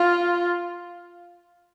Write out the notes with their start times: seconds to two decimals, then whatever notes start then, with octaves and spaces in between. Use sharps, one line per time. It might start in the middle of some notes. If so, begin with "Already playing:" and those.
Already playing: F4